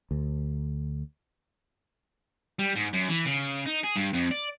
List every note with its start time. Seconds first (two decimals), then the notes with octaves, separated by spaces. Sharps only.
0.11 D2
2.59 G3
2.76 G#2
2.93 F#2
3.08 E3
3.26 C#3
3.66 D#4
3.83 G#4
3.96 G2
4.13 F2
4.31 D5